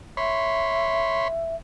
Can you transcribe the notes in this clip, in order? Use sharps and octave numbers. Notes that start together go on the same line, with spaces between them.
C#5 E5 B5 C6